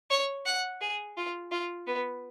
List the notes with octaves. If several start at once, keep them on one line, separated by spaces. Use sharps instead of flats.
C#5
F#5
G#4
F4
F4
B3